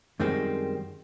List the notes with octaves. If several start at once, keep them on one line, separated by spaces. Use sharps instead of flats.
F#2 D#3 G3 G#3 C4